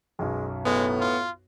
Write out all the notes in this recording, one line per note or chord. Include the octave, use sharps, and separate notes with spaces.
B1 F#2 G#3
A2 G#3 B3
F4